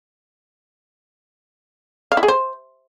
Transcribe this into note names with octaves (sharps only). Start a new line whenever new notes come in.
F5
E4
G#4
C5